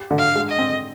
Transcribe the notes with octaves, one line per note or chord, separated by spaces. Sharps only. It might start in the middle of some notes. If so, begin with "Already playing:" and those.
Already playing: G4
D3
F5
G#3
D#5
C4